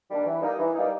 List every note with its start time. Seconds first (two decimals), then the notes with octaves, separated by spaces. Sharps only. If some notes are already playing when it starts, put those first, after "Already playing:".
0.10 D#3 G3 A#3 D4
0.26 E3
0.42 G3 A#3 D#4
0.59 E3
0.75 G3 A#3 D#4